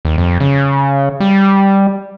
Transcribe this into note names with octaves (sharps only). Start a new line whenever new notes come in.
D#2
F2
C#3
G3